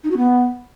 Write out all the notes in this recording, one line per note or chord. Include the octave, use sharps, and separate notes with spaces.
D#4
F#4
B3